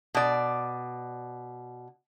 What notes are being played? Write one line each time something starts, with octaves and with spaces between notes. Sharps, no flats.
B2 D5